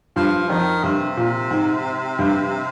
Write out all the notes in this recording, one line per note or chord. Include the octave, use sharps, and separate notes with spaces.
G2 F3
F2 D#3
G2 C3
A#2
G#2
G2